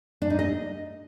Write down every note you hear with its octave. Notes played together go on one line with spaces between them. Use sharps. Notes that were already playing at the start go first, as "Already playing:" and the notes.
D4
D#4
D#5